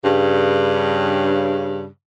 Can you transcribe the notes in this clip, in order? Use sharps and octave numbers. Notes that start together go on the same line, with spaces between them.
G2 C#3